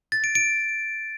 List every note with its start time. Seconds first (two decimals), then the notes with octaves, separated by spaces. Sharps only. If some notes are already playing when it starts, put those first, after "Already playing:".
0.12 A6
0.24 D7
0.35 D7